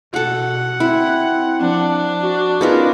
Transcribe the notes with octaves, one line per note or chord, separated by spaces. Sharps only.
B2 F#4 A4 F#5
C4 E4
F3 D4
F#4
B3 C#4 D#4 F4 G#4 A#4